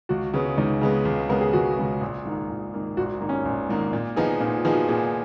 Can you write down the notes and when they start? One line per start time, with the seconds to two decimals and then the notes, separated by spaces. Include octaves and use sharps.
0.09 C#2 F#4
0.34 C#3 G#3 B3
0.58 C#2 D#4
0.81 C#3 G#3 B3
1.05 C#2
1.29 C#3 G#3 B3 A#4
1.41 G#4
1.53 C#2 F#4
1.77 C#3 G#3 B3
2.01 A#1
2.25 G#2 D#3 A#3
2.50 A#1
2.74 G#2 D#3 A#3
2.97 A#1 F#4
3.21 G#2 D#3 A#3
3.29 C#4
3.45 A#1
3.69 G#2 D#3 A#3
3.93 A#2
4.16 F3 B3 D#4 G#4
4.40 A#2 D#4
4.57 F4
4.65 F3 B3 D#4 G#4
4.73 F#4
4.88 A#2 G#4